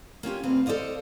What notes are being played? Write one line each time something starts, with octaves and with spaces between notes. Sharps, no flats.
A#3 C#4 F4 G4
D2 C4 B4 F5
A4 C5 D5 D#5 F5